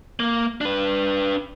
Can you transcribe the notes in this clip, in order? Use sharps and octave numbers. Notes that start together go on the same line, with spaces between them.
A#3
D4 B4